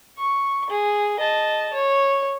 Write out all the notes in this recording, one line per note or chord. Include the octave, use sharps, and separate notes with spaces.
C#6
G#4
D#5 A5
C#5